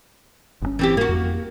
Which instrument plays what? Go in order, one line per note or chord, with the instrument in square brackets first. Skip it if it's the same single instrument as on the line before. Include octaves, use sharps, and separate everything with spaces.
[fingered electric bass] G1 C3 C#4
[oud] E3 C4 G4
A#3 F#4
[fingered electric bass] F2